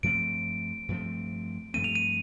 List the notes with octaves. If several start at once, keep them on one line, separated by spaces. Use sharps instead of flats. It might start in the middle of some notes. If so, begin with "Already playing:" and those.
G2 F3 A3 C4 D7
G2 F3 A3 C4
G2 F3 A3 C4 D#7
F7
D#7